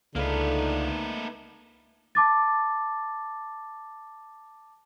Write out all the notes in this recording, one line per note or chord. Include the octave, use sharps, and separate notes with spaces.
C#2 D3 A3 A#3 D#4 B4 F5
A5 D6 A6